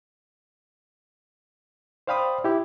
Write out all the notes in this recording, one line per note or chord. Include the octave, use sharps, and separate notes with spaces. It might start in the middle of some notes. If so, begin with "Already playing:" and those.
C5 D5 F5 G5 B5 D#6
E4 G4